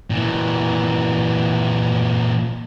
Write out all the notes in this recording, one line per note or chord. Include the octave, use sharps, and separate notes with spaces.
A#2 E3